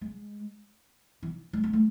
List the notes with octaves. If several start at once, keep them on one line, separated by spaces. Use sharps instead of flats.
G#3
E3
G#3
G#3
A3